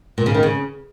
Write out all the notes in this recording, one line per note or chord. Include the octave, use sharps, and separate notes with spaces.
A#2
C#3
D#3
C#3